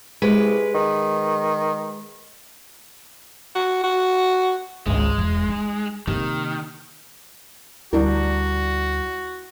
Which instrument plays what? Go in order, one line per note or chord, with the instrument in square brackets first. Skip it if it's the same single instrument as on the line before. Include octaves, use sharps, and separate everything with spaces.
[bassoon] C2 [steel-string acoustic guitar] G#3 B4
[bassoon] D#3
[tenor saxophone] F#4
F#4
[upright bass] G#1 C#2 [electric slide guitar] G#3
[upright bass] E1
D#4
[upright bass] C3 A#3 [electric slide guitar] D#3
[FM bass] D2 [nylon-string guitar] G3 D4 A#4 [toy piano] E4 [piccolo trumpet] F#4